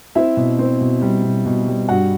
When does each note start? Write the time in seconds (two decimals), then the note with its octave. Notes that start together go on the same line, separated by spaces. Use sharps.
0.15 C4 E4 E5
0.37 B2
0.59 C4
0.81 B2
1.02 G3
1.24 B2
1.45 B2
1.68 G3
1.89 G2 F#4 F#5